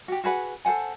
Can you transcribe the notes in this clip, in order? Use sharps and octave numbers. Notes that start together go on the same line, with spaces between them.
F#4 G4
F#4 G#4 B4 F#5
A4 C5 F#5 G#5